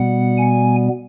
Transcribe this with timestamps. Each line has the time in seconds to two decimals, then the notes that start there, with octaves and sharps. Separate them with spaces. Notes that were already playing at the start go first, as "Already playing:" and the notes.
Already playing: B2 G3 B3 F#5
0.38 G#5